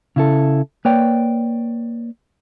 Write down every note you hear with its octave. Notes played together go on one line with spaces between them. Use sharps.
C#3 E4 A4
A#3 B4 C#5 D5 G5